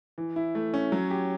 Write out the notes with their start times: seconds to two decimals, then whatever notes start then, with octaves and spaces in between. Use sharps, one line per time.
0.18 E3
0.36 E4
0.55 A3
0.74 C#4
0.92 F#3
1.10 G4